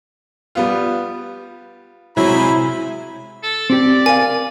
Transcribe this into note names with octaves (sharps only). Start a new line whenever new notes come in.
G3 B3 F4
C3 F#3 G#3 E4 B5
A4
C4 G4 D5
A#4 F5 G#5